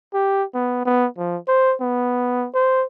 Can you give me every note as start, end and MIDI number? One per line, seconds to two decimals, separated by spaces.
0.14 0.43 67
0.55 0.84 59
0.85 1.07 59
1.18 1.37 53
1.47 1.75 72
1.81 2.47 59
2.54 2.85 72